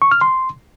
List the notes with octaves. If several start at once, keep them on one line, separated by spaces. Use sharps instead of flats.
C#6
F6
C6